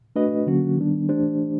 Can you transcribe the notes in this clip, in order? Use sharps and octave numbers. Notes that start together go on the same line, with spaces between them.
A3 D4 F#4 B4 D#5
D3 F#3 A#3 C#4 F#4
D#3 G3 B3 D4
E3 A3 D4 G4 C5